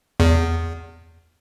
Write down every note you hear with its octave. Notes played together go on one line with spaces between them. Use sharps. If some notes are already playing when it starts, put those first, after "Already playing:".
E2